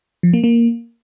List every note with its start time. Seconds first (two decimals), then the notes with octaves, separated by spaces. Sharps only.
0.23 F3
0.33 A#3
0.44 A#3